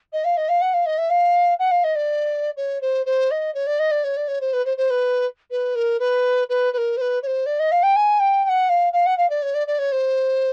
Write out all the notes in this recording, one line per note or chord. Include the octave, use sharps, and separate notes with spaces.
D#5
F5
D#5
F5
F#5
F5
D#5
E5
F5
F#5
F5
D#5
D5
C#5
C5
C5
D#5
C#5
D5
D#5
D5
C#5
D5
C#5
C5
B4
C5
C5
B4
B4
A#4
B4
B4
B4
A#4
C5
B4
C#5
C5
D5
D#5
F5
G5
G#5
G5
G5
F#5
F5
F5
F#5
F5
D5
C#5
D5
D5
C#5
C5